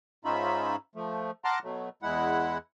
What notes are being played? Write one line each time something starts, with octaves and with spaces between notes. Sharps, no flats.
G#2 C#4 D#4 F4 E5 B5
F3 A3
F#5 A5 A#5 C6 D6 F6
B2 F#3 A3
E2 G#3 E4 F#5